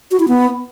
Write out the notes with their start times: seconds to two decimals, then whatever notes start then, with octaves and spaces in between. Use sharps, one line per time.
0.11 F#4
0.20 E4
0.28 B3